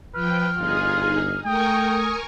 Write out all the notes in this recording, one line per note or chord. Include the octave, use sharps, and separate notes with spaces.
F3 B4 G5 F6
G1 D#4 F4 G#4
A3 A#4 G5 G#5 C#6 D#6